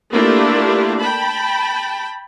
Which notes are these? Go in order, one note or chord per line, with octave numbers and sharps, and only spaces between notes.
A3 A#3 D4 E4 F4 G4
G5 A5 B5